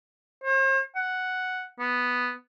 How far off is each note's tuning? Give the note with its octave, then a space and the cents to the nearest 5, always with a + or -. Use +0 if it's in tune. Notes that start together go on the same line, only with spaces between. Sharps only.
C5 +45
F#5 +0
B3 +0